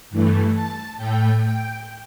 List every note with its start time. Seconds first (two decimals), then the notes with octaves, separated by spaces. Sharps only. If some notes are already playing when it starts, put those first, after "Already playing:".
0.10 G2 E3 A3
0.53 A5
0.97 A2 A3 G5
1.41 G5